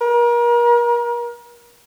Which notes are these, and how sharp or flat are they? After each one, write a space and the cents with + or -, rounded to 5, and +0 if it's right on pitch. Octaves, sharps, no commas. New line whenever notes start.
A#4 +35